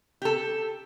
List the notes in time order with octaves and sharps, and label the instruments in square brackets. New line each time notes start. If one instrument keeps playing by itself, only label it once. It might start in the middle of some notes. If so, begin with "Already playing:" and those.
[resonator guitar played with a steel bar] G4 A4